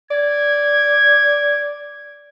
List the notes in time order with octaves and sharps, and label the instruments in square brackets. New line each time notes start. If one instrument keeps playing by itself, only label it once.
[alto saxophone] D5 [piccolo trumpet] G#6